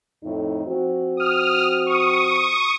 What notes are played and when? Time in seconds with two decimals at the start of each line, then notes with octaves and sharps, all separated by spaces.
0.23 F2 A2 D#4
0.66 F3 C4 F#4
1.17 D#6 F6
1.86 C#6 D#6